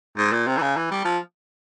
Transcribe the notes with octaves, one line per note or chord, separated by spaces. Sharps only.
G#2
A#2
C3
E3
C#3
E3
G3
F3